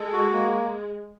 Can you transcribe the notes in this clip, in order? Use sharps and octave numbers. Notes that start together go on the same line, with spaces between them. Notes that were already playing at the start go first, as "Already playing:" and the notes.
Already playing: G#3 A4
F#4
A#3